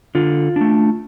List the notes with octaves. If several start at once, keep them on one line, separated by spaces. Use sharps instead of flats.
D3 F4
A3 D4